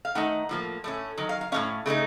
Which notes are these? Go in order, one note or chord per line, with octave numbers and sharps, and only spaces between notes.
F5
D#3 A3 D#4 F#5
A2 F3 A#3
A2 A3 C#4
D#3 F#3
F5
F5
A2 A3 C#4 F5
C#3 A3 C4 D#4